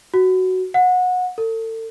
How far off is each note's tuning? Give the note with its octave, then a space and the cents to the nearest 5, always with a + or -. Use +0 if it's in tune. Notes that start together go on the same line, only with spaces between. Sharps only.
F#4 +5
F#5 -25
A4 +35